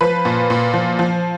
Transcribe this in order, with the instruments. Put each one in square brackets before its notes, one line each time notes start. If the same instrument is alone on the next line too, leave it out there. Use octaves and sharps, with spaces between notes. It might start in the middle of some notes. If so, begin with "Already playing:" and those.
[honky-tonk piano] F3 B4
A#2
A#2
F3
F3